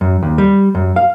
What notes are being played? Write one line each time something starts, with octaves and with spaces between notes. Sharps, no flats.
F#2
D#2
G3
F#2
F5